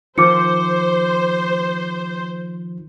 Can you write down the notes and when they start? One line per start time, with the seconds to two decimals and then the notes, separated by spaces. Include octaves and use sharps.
0.18 D#3 F3 C5 D6 C#7